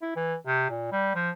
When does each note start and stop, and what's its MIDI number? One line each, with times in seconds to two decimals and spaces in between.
0.02 0.12 64
0.16 0.35 52
0.46 0.67 48
0.70 0.88 46
0.92 1.15 55
1.15 1.30 53